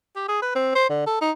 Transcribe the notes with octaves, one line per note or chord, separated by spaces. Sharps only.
G4
G#4
B4
C4
C5
D3
A4
D#4